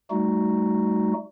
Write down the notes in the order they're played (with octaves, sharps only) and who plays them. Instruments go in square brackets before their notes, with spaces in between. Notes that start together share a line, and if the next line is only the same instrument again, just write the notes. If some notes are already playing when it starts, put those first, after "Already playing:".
[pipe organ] G3 A3 D#4 F#4